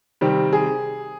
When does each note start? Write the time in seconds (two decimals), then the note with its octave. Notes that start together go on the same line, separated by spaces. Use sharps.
0.21 C3 D#3 G3 C4 G4
0.53 G#4